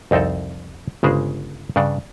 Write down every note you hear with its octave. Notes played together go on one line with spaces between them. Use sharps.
C2 F2 C4 D#4 A4
G1 C#3 G#3 G#4 C5
G2 C#3 D4 F#5